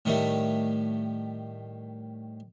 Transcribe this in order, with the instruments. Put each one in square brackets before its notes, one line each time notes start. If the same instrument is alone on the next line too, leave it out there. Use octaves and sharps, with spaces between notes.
[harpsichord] A2 D#3 G3 A3